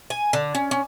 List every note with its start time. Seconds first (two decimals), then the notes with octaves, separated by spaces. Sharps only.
0.10 G#5
0.33 D3
0.55 C#4
0.71 C#4